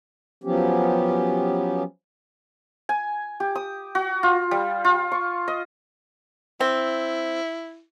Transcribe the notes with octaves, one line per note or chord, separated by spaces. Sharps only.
F3 F#3 B3 C#4 G4
G#5
G4
D#6
F#4
F4
G3
F4
C#6
D#5
C4 E4